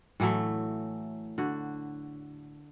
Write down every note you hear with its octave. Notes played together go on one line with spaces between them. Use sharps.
A2 E3 F#3 A3
D3 F#4